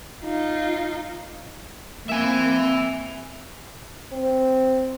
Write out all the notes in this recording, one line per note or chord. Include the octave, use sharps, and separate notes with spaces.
D#4 F4
A#3 C4 E5 G#5
C4